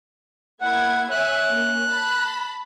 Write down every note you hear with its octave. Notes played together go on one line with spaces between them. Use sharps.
A#3 E4 F#5 G#6
C#5 E5 G#5 F#6
A#3 C#4
A5 B5